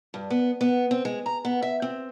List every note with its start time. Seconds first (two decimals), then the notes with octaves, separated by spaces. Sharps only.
0.14 G2
0.30 B3
0.61 B3
0.91 C4
1.05 G#3
1.26 A#5
1.45 B3
1.62 E5
1.82 C4